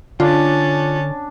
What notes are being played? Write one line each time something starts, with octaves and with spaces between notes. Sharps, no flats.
D3 C#4 D4 F4 A5